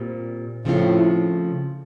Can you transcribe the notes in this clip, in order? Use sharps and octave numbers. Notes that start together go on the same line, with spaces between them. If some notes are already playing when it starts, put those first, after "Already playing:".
Already playing: A#2 G3 C4
A2 C#3 F3 A3 C4 F4